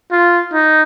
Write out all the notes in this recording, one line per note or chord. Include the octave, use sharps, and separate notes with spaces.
F4
D#4